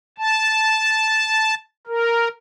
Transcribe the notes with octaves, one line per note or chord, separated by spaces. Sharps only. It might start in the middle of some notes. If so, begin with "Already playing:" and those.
A5
A#4